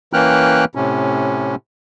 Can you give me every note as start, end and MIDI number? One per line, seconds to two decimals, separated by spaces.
0.13 0.65 52
0.13 0.65 58
0.13 0.65 61
0.13 0.65 79
0.13 0.65 89
0.13 0.65 90
0.75 1.55 45
0.75 1.55 48
0.75 1.55 61